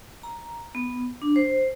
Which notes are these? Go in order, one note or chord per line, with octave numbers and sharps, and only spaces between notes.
A#5
B3
D4
C5